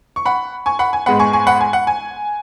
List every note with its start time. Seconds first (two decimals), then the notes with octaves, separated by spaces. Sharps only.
0.16 C#6
0.25 F#5 B5
0.66 G#5 C#6
0.79 F#5 B5
0.93 G#5
1.06 G#2 G#3 B3 F#5 B5
1.20 G#5 C#6
1.33 G#5 C#6
1.47 F#5 B5
1.61 G#5
1.73 F#5
1.87 G#5